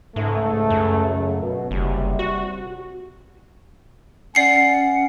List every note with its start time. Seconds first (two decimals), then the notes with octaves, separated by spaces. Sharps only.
0.16 C#2 G#2 A3
0.70 F#2
1.07 C#3 F#3
1.42 B2
1.71 F#1 C3 G3
2.19 F#4
4.35 C#4 D5 F#5 C7 C#7